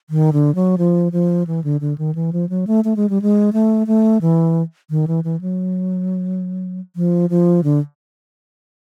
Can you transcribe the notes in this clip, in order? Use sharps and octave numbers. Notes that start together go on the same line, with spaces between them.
D#3
D3
F#3
F3
F3
E3
D3
D3
D#3
E3
F3
F#3
A3
A3
G#3
G3
G#3
A3
A3
E3
D#3
E3
E3
F#3
F3
F3
D3